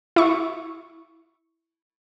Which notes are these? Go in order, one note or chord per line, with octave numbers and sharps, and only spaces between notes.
E4 C#6